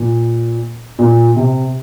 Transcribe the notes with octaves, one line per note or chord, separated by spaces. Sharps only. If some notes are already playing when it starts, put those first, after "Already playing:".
Already playing: A#2
A#2
C3